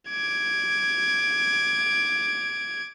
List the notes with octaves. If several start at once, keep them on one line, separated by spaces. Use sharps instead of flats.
D6 G#6